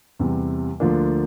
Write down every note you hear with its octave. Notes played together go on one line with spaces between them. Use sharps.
E2 C3 G3
D2 D3 F3 A#3 D4